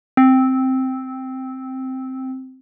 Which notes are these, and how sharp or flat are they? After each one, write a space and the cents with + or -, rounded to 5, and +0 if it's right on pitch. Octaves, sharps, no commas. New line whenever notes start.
C4 +0